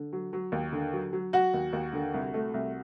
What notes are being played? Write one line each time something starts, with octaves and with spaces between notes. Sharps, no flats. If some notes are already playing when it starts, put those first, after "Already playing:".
Already playing: D3
F#3
F#3
D#2
D3
F#3
F#3
F#3 F#4 F#5
D#2
D#2
D3
C2
A3
C2